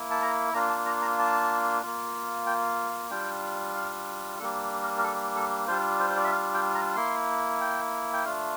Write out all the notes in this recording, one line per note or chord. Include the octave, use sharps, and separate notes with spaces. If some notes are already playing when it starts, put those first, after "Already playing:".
Already playing: A#3 E4
A5
A#5
A#3 D4 F4 A#5
A5
A#5
A#5
A5
A#3 F4
G5
F5
G3 D4 F4 G5
F5
G3 A#3 D4 A4
A#4
A#4
A4
A4
G3 D4 F4 C5
C5
C5
D5
E5
F5
G5
A#5
A#3 E4 C6
G5
G5
A3 D4 F4 F5